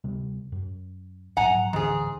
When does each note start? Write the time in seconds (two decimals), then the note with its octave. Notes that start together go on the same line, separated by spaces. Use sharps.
0.04 D2 C3 G3
0.52 F#2
1.37 A#1 G#2 F#3 F#5 G#5 A#5
1.73 D1 G#2 D3 E3 G#4